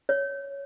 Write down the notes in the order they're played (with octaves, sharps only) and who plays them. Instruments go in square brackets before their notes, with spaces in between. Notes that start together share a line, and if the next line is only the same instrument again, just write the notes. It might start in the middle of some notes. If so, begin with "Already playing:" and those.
[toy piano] C#5